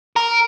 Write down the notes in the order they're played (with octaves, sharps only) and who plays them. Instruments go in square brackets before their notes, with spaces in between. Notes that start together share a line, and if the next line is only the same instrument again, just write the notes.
[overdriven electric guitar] A#4